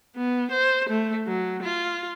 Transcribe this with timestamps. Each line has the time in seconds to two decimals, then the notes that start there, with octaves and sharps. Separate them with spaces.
0.16 B3
0.51 C5
0.89 A3
1.27 F#3
1.63 F4